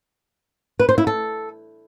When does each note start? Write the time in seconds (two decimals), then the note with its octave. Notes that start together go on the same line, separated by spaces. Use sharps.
0.79 B4
0.89 C5
0.98 E4
1.07 A4